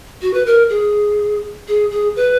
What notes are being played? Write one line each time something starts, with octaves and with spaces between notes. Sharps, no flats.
F#4
B4
A#4
G#4
G#4
G#4
B4